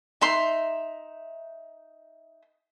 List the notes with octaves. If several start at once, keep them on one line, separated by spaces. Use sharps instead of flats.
D#4 E5 C6